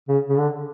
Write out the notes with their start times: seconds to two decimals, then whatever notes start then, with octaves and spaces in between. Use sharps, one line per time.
0.09 C#3
0.29 C#3
0.38 D3